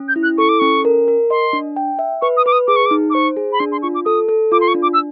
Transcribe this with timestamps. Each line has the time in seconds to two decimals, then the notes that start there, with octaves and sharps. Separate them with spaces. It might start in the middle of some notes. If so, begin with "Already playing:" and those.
Already playing: C#4
0.08 G6
0.16 E4
0.23 F#6
0.38 A4 C#6
0.49 D6
0.59 C#4 C#6
0.85 A#4
1.08 A#4
1.30 D#5 C6
1.53 D4
1.76 G5
1.99 E5
2.22 B4 C#6
2.37 D#6
2.46 B4 D6
2.52 D#6
2.68 G#4 D6
2.76 C#6
2.86 D6
2.91 D#4
3.10 D6
3.14 C5 C#6
3.37 G#4
3.53 B5
3.59 D4 C6
3.72 C6
3.82 F4 C#6
3.95 D6
4.05 A4 D#6
4.29 A4
4.52 F4 D6
4.61 C6
4.68 C#6
4.75 D4
4.82 D6
4.94 E6